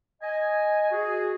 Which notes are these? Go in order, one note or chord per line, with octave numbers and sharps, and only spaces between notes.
D#5 G#5
F#4 G#4